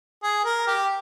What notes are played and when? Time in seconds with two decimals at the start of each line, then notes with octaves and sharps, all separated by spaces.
0.23 G#4
0.45 A#4
0.67 G4